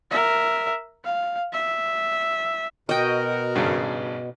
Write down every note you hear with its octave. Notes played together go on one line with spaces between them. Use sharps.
A#4 E5
F5
E5
B2 F#4 A#4 D#5 G5
G#1 G2 C#3